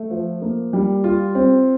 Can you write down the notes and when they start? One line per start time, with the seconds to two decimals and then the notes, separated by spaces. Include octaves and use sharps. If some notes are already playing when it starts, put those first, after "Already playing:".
Already playing: A3
0.10 F3
0.42 A#3
0.73 G3
1.04 F4
1.35 C4